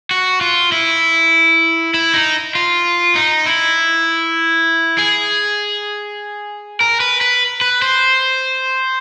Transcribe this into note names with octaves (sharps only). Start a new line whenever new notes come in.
F#4
F4
E4
E4
D#4
F4
D#4
E4
G#4
A#4
B4
B4
B4
C5